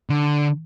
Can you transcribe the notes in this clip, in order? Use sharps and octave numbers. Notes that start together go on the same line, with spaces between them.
D3